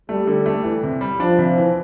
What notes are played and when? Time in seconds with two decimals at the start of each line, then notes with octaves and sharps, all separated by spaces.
0.09 G3 A3
0.27 D3
0.46 A3
0.64 E3
0.83 C3
1.01 G3
1.20 F3 D4
1.39 C3
1.57 E3